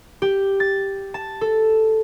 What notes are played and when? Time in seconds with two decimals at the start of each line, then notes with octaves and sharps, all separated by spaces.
0.22 G4
0.60 A6
1.14 A5
1.41 A4